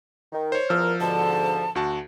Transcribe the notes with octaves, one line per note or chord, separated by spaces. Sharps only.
D#3
C5 C#5
E2 F3 A#4 E6 F6
G#2 B2 D3 A5
D2 F#4 A5